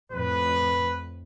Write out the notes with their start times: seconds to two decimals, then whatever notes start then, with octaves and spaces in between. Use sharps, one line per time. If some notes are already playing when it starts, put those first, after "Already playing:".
0.12 F2 A2 B4